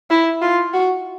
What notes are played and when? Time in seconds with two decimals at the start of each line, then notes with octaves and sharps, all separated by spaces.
0.11 E4
0.42 F4
0.73 F#4